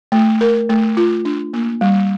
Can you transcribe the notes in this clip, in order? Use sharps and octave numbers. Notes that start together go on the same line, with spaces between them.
A3
A#4
A3
F4
D4
A#3
G3